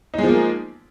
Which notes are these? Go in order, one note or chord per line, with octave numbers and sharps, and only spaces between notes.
F3 G#3 A#3 D#4